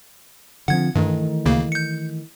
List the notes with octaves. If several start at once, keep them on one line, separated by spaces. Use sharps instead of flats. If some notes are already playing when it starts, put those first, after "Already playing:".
D3 F3 C4 F#5 G#6
G2 D#3 E3 A3
D2 C#3 A#3
G6 C#7